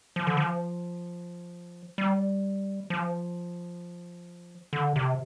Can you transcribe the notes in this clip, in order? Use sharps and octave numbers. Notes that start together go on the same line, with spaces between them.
F3
D3
F3
G3
F3
D3
C3